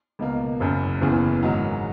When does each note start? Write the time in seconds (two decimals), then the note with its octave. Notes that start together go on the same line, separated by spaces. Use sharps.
0.19 C#2 B2 A#3
0.60 F#1 F#2 C#3
1.01 F#1 E2 C#3 E3
1.43 G#2 D#3 F#3